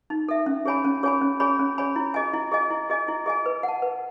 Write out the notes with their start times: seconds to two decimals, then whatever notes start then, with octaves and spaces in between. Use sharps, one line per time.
0.10 D#4
0.29 A4 E5
0.46 C#4
0.66 G#4 C#5 G#5 B5
0.85 C#4
1.03 G#4 C#5 G#5 B5
1.21 C#4
1.40 G#4 C#5 G#5 B5
1.59 C#4
1.78 G#4 C#5 G#5 B5
1.96 E4
2.14 G#4 D#5 G#5
2.33 E4
2.52 G#4 D#5 G#5
2.70 E4
2.90 G#4 D#5 G#5
3.08 E4
3.26 G#4 D#5 G#5
3.46 B4
3.63 F#5
3.68 A5
3.82 B4